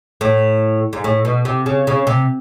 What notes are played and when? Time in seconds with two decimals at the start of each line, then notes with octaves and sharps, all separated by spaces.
0.21 A2
0.93 G#2
1.04 A2
1.25 B2
1.45 C3
1.66 C#3
1.87 C#3
2.07 C3